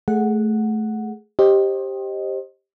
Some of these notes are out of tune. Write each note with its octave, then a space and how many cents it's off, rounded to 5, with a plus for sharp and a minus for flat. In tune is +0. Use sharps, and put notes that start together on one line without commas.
A3 -15 G#4 +0 F#5 -5
G4 +0 C5 +25 D#5 +0